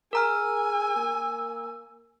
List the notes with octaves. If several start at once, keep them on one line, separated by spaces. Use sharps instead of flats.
G#4 A#4 G#5 A#5 E6 F6
A#3